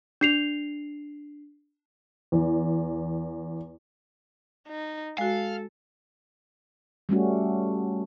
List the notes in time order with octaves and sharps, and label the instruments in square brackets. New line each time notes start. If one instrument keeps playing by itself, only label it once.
[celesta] D4 C7 F7
[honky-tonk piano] E2
[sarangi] D#4
[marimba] G#3 F#4 [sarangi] A4 [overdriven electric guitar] F5
[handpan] G3 A3 C#4 F#4